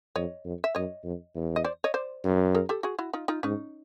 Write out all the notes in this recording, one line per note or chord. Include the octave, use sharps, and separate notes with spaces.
F2 C#5 D#5
F2
E5
F#2 C#5 D#5
F2
E2
D#5
C5 D5
C#5 D#5
C5 D5
F#2
G#4 A#4
G4 A4
F#4 G#4
E4 F#4
D#4 F4
D#4 F4
G#2 C#4 D#4